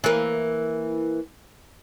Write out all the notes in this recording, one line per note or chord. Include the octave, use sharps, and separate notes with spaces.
E3 A#3